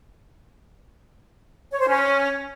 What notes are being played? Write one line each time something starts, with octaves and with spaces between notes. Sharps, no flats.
C#5
C5
C#4